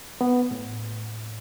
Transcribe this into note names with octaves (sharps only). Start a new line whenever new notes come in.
B3
A2